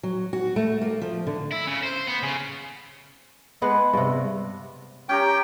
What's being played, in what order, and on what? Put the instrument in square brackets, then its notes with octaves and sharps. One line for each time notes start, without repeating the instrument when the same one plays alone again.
[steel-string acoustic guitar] F#3
F#4
A3
A#3
F3
D3
[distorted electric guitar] E4
C#3
C5
B3
C#3
[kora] G#3 B3 B4
G2 C3
[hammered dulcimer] C#4 G4 A#5 [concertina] G5